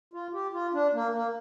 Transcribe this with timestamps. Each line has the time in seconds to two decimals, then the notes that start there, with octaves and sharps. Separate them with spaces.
0.13 F4
0.33 G4
0.53 F4
0.73 D4
0.94 A#3
1.13 A#3